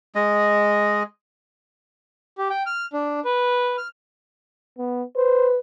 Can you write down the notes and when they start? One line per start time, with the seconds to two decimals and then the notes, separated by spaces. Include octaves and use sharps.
0.15 G#3 D#5
2.38 G4
2.50 G5
2.66 F6
2.93 D4
3.25 B4
3.78 F6
4.78 B3
5.17 B4 C5